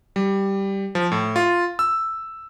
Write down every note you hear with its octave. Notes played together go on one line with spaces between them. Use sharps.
G3
F3
A2
F4
E6